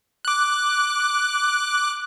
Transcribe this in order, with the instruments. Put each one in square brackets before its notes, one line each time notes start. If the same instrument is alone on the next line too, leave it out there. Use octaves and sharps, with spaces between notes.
[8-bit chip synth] D6 F#6